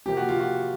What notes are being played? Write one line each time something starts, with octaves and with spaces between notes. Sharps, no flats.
C3 F3 A#3 G4
F#4
F4
F#4